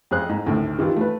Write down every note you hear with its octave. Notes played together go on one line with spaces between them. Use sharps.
F2 G#4 C5 F#6
G#2
D2 A2 D#3 C4
D#3 E3 G3 F4
A3 B4